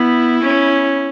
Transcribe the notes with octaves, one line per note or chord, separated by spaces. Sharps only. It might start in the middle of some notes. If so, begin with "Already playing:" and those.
Already playing: B3 E4
C#4